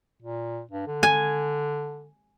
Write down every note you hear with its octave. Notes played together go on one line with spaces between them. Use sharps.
A#2
G2
D3
G#5